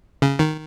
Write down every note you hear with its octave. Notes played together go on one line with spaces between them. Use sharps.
C#3
D#3